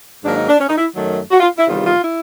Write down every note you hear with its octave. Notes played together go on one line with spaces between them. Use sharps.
G#2 D#3 F#3 A#3 D4
D#4
D4
C#4
D#4
E4
F#2 D#3 F#3 A3
F#4
F4
E4
E2 C3 D#3 G3 F4
F4
E4